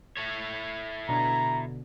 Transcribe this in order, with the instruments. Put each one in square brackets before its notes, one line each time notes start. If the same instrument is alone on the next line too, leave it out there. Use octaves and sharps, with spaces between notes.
[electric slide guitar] E4 A4 C#5
[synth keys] B2 D3 [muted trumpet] A#5